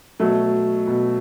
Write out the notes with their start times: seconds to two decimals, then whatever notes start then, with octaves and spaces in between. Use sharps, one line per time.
0.20 B2 F#3 A3
0.87 B2